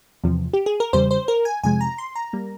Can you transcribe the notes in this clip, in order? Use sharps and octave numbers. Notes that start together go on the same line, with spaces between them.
E2 C3 F3
G4
G#4
A#4
E2 C#3 G3 C5
C5
A#4
G#5
F2 C3 F3 G#3 G#5
A#5
C6
A#5
G3 A#3